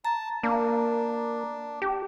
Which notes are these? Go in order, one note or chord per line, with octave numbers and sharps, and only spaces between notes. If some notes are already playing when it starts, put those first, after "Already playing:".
A5 A#5
A#3 D4
G4